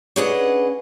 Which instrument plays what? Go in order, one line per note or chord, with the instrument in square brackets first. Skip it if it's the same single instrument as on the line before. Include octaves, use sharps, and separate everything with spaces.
[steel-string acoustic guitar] C#4 D4 G#4 B4 D#5 F#5